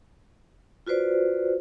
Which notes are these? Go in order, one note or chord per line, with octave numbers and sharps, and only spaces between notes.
F4 F#4 B4 C5 D5